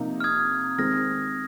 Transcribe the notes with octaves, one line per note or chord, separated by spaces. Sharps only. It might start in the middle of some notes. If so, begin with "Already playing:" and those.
Already playing: C3 F3 A#3 D#4
F6
D#6 G#6
D#3 G#3 C4 F6 A#6